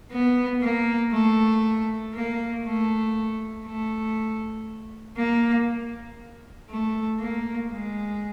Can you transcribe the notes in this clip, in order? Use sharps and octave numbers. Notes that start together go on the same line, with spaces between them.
B3
A#3
A3
A#3
A3
A3
A#3
A3
A#3
G#3